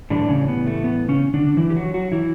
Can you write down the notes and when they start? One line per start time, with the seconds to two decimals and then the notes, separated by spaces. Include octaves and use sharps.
0.10 A2 D3 E3 G3 D4
0.29 C#3 C#4
0.48 B3
0.67 A3
0.84 B3
1.08 C#3 C#4
1.34 D3 D4
1.57 E3 E4
1.70 G4
1.76 F#3 F#4
1.94 F#3 F#4
2.12 E3 E4